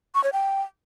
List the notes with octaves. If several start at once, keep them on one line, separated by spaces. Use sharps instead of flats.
C#6
C#5
G5